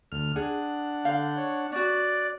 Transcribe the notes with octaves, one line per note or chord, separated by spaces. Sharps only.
D2 F6
D4 G#4 F#5
D3 F5 G6
C#5
C#4 F#4 D5 F#6